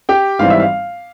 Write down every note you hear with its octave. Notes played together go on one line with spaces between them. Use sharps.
G4 G5
G#1 G#2 E3 G3 C4 F5
E5
F5